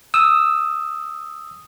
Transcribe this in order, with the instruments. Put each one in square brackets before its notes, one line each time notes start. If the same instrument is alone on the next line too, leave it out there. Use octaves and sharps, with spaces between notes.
[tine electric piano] D#6 E6